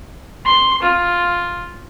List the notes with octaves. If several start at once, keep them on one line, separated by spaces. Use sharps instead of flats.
C6
F4